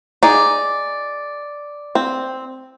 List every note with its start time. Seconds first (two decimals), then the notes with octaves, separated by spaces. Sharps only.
0.23 D#4 G#4 D5
1.95 C4